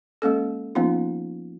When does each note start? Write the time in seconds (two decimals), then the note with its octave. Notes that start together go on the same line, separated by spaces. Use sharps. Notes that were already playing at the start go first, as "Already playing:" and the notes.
0.22 G#3 A#3 C#4 A4
0.75 F3 A#3 B3 C#4 D#4 F4